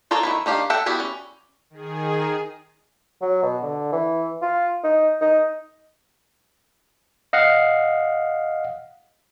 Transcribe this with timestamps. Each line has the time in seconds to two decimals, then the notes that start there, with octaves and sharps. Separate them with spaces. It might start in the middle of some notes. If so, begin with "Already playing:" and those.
0.11 F4 A4 A#4 C#5 D5
0.23 D#3 F3 E4
0.46 D#3 D4 G4 F5
0.70 A4 E5 F#5 G5
0.86 G3 B3 E4 F#4 G4
1.00 C#4
1.70 D#3 G#4
3.22 F#3
3.43 B2
3.63 D3
3.92 E3
4.42 F4
4.84 D#4
5.21 D#4
7.33 D#5 F5 F#5